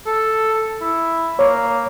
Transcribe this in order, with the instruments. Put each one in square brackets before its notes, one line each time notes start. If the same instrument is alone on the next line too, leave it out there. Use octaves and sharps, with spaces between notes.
[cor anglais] A4
E4
[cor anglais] A#3 [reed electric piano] C#5